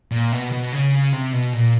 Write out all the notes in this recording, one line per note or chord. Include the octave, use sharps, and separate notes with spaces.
A#2
B2
B2
C#3
C3
B2
A#2